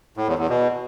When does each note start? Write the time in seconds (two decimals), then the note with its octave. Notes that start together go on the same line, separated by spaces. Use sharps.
0.17 A2
0.28 E2
0.39 E2
0.49 B2